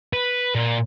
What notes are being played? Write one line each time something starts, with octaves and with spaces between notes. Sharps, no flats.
B4
A#2